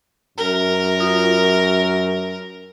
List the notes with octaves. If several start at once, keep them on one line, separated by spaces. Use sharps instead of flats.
F#2 A#4
F4